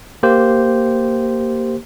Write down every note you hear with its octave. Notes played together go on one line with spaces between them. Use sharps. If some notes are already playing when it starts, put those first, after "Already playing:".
A#3 G4 C5